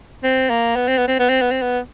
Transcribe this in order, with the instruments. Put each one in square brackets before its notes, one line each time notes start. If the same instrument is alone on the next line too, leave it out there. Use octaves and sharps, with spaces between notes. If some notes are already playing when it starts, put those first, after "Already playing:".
[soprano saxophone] C4
A#3
B3
C4
B3
C4
B3
C4
B3
C4
B3